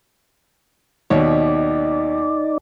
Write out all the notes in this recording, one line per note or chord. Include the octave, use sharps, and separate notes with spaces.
D#2 B2 D#4 C#5 D5